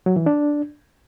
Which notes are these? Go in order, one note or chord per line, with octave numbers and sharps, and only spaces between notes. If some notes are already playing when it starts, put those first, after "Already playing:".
F#3
E3
D4